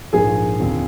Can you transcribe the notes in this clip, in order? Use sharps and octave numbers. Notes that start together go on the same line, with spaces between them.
A#1 G#2 F3 A#3 G#4 G#5
D#2 D3 F3 C4